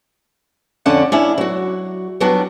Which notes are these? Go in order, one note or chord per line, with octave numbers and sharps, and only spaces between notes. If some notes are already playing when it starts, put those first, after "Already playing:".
F2 D3 C#4 D5 F#5 A5
C#4 D4 E4
F#3 F#4
F#3 G3 B3 D4 F#4